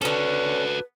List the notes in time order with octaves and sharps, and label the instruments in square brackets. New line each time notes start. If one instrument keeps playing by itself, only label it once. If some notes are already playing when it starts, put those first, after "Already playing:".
[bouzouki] D3 C#4 [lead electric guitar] F#4 A4 [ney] B4